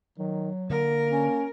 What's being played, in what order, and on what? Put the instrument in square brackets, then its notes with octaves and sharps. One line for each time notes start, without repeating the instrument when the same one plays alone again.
[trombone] D#3 [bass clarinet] F#3
[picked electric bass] D3 [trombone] A#3 [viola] A#4
[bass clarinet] C#4